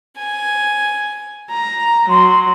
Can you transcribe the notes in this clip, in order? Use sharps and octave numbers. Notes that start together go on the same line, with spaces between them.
G#5
A#5
F#3 C6